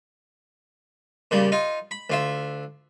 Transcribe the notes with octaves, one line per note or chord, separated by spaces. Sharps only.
A#2 C#3 G3
D#4 F4
B5
D2 F4 E5